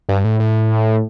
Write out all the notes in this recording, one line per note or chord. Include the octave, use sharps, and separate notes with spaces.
G2
A2
A2